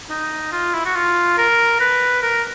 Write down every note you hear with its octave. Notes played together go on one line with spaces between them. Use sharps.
D#4
F4
E4
F#4
F4
A#4
B4
A#4